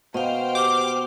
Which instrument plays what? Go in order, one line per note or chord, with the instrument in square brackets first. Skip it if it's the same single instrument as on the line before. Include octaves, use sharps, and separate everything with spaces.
[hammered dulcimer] B2 [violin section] C5 G5 F6 [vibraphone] D#5 F5
[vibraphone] G4 [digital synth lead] D6